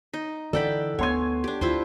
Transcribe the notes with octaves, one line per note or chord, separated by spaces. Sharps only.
D#4
D3 E3 A4 D5 F#5 G5 B5
D2 A#3 B3 C#5 F#5 G#5 C6 G#6
D4 G4
D2 E4 F4 C5